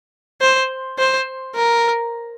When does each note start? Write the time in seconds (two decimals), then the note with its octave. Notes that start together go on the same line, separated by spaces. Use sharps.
0.41 C5
0.99 C5
1.55 A#4